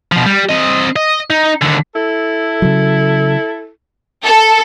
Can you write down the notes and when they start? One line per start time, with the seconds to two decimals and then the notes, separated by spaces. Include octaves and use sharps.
0.12 B2 F3
0.26 G3
0.49 C4 D#5
0.96 D#5
1.30 D#4
1.62 D#2 D3
1.95 E4 A4
2.62 C#3 F#3
4.25 A4